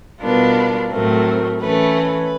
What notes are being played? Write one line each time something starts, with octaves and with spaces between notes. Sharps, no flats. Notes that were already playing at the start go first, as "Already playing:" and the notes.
B2 G3 B3 D4 F4 A#4
A2 F#3 A3 C4 A#4
E3 A3 C#4 B4
B4